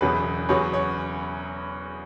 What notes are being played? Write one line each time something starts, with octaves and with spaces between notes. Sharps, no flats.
E1 E2 C#3 F#3 B3 B4
E2 C#3 F#3 B3 C#5
C#5